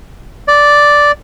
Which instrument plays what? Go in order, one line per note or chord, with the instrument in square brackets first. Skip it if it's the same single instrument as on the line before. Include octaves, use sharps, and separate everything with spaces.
[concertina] D5